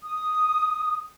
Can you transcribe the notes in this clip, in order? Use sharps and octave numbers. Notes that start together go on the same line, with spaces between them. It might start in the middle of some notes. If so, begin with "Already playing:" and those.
D#6